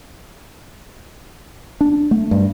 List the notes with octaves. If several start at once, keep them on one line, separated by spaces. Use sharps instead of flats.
D4
A3
G2